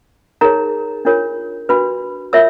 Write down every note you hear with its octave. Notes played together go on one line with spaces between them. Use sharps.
D#4 G#4 A#4 C#5 A#5
D4 F4 A#4 C#5
D4 F#4 B4 B5
F4 A#4 C#5 E5 E6